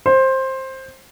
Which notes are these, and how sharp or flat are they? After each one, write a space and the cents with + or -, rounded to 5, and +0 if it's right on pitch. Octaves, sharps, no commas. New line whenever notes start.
C5 +15